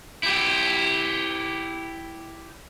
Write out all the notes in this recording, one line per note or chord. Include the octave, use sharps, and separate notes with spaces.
E4 G4